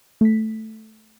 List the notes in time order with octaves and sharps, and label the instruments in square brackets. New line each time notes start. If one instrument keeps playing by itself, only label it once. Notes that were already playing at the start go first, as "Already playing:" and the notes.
[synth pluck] A3 B6